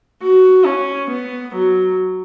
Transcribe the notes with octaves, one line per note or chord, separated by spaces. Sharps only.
F#4
C#4
B3
F#3